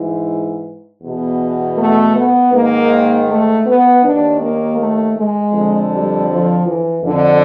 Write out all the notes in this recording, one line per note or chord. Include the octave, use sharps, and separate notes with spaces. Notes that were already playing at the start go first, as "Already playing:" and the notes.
Already playing: G#2 E3
E2 B2
A3
B3
G#2 D#3 A#3
A3
B3
D#2 D#3 D4
A#3
A3
G#3
F2 D3
G3
F3
E3
F2 D3